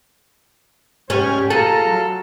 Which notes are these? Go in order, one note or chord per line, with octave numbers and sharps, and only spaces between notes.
G#2 C#4 G4 C#5 G#5 F6
F4 G#4 A4 A#5
F#3